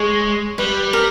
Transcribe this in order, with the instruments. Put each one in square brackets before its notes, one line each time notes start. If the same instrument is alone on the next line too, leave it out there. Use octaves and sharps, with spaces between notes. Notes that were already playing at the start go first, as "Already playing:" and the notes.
Already playing: [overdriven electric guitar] G#3 [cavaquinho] C#5
[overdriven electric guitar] G3 [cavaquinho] B4
[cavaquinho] A#4